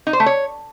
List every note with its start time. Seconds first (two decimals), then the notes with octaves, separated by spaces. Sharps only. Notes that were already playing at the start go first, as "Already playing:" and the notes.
0.07 D#4
0.13 C5
0.20 A3
0.26 C#5